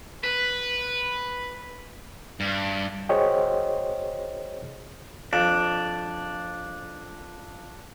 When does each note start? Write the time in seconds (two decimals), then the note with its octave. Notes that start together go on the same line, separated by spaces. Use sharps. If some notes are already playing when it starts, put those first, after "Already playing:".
0.24 B4
2.40 G2
3.09 F#4 G#4 C5 C#5 D#5 G5
5.33 F2 D4